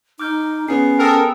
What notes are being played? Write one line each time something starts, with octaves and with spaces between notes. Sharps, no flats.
D#4 D6 F6 G6
B3 C#4 G#4 C7
A4 A#4 G5 D#6 E6